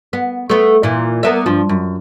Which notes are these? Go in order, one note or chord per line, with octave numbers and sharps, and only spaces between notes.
B3
A3 B3
A#2 E3
A#3 B3 E5
G2 F3
F#2